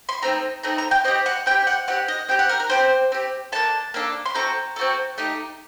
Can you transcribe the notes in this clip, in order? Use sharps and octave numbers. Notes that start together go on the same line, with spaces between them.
C6
A3 C4 D#4 A#5
A3 C4 D#4 A#5
A#5
G5
C4 G4 D#5
F#5
C4 G5
G4
F#5
C4 G4 F#5
D#5
C4 G4 G5
F#5
A#4
A#4
C4 G4 C5
C4 G4
A#3 D4 A4 A5
A#3 D4 A4
C6
C4 F#4 A4 A#5
C4 F#4 A4
A3 D#4 G4